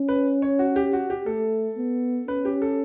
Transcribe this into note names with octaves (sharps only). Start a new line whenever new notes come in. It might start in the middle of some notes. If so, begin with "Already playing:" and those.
Already playing: C#4
B4
C#5
F#4
G4
F#4
G4
A3 A4
B3
C#4 B4
G4
A4